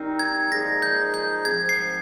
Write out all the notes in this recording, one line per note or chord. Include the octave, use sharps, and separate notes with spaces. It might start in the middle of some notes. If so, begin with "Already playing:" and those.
Already playing: D#3 G3 C4 D#4 A#4
G#6
A#2 F3 G#3 D#4 G#4 A#6
G6
G6
G#2 F3 C4 G#6
C7